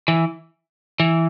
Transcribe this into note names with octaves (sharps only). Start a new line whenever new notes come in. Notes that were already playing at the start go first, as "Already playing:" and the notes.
E3
E3